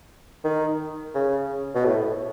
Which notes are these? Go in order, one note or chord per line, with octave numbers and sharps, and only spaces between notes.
D#3
C#3
B2
A2